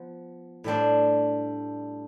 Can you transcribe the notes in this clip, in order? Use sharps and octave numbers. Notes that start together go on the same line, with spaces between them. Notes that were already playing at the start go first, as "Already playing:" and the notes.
Already playing: F3 B3
A2 G3 D4 A4 C5